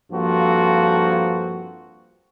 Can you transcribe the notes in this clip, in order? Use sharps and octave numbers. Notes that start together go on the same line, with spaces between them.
G2 F3 A#3 C4 F#4 A4